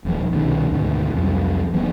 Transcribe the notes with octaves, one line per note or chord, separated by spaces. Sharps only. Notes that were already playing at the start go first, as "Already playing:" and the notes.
D#1 B1 F3
C2 B2 D#3 C#4
D2 G#2 B2 D#3
C2 F2 F#3 G3
D#1 F3 A#3 B3